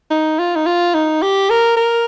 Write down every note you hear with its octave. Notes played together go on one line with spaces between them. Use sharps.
D#4
F4
D#4
F4
D#4
G4
A#4
A#4